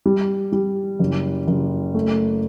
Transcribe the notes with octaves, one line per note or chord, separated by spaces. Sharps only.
G3
G3
F#1
F#1
A3